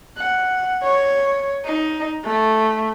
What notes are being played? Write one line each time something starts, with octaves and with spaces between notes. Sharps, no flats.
F#5
C#5
D#4
A3